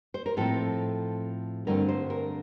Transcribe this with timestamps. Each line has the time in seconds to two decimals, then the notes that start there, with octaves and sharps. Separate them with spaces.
0.14 C5
0.26 A#4
0.37 A2 F3 C4 A4
1.67 G2 D3 A3 C4 A#4
1.89 C5
2.10 A#4